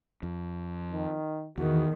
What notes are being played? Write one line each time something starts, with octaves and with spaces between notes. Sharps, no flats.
F2
D#3
E2 D#3 F#4